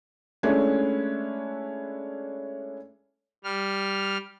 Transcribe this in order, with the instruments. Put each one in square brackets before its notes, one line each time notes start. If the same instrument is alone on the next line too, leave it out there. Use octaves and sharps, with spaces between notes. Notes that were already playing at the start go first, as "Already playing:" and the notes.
[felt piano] G#3 A3 C#4 D4 E4
[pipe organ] G3 F6